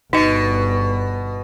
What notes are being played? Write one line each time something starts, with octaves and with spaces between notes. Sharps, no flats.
G1 B2 D#4 D#5